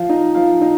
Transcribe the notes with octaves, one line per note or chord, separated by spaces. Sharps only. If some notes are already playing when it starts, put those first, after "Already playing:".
Already playing: F3 F5
D#4
F3 F5
D#4